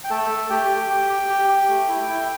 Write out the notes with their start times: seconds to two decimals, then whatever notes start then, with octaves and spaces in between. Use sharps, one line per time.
0.04 G5
0.10 A3 A4 A5
0.30 A3
0.50 A3 G4 G5
0.69 G4
0.90 G4
1.09 G4
1.29 G4
1.48 G4
1.69 A3
1.88 E4
2.09 E4